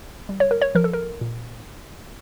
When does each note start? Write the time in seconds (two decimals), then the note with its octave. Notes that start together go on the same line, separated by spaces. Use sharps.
0.29 G3
0.40 C#5
0.51 A#4
0.62 C#5
0.75 F3 A#4
0.84 A4
0.93 A#4
1.21 A#2